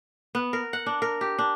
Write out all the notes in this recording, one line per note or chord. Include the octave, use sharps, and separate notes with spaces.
B3
A#4
F#5
D4
A#4
G4
D4